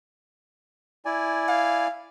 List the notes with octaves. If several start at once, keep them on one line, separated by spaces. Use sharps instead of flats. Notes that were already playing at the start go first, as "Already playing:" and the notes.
E4 D5 G#5
F5